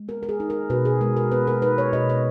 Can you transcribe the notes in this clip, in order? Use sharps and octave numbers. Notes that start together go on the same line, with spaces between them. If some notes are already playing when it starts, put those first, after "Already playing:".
Already playing: G#3
B3 A#4
A#4
G#4
D#4
A#4
B2 B4
G#4
G#3 A#4
A#4
B3 B4
A#4
D#4 B4
C#5
B2 D#5
D#5